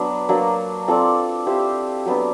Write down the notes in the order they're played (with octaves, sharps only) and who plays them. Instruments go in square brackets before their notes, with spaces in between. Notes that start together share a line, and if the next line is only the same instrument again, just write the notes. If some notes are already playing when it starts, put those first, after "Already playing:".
Already playing: [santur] F#3 B3 D4
F#3 A#3 D4
C4 F4 A4 D5
E4 G4 C5 F5
F#3 B3 D4